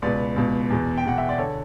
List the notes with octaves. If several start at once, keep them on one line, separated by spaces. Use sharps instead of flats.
C#2 B2 B4 D5
C#2 B2
E2 B2
G5
E2 B2 F#5
E5
D5
D3 A4 C#5